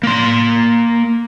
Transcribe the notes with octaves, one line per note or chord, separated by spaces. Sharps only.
A#3 C6